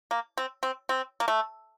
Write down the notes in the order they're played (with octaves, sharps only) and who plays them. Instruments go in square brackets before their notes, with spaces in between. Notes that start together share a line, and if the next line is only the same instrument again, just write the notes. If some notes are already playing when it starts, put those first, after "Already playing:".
[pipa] A#3
C4
C4
C4
A#3
A3